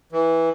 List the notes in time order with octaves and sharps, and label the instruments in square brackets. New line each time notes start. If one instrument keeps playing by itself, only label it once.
[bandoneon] E3